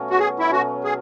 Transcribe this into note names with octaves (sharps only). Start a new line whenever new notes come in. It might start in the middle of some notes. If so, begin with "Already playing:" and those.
Already playing: B2 F#3 A3 C#4
F#4
G#4
E4
B2 F#3 A3 C#4 F#4
G#4